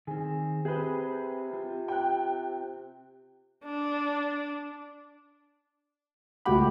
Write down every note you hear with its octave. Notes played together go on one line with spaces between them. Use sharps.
D#3 C4 G#4
C3 C4 G#4 B4 C5
C4 F4
G5 F#6
D4
C#2 A3 F#4 G4 B5